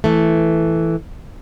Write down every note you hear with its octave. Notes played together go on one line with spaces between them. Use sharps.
E3 A3